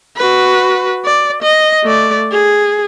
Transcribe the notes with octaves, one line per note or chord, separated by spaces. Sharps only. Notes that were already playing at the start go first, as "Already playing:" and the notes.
F#4 B4
D5
D#5
A3 D5
G#4